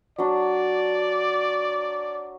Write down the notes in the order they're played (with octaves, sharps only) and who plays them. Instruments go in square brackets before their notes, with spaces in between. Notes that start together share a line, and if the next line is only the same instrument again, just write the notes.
[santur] F#3 D4 [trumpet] D5